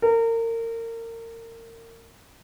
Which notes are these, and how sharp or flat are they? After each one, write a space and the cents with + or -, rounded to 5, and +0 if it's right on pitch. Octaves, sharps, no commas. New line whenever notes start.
A#4 -30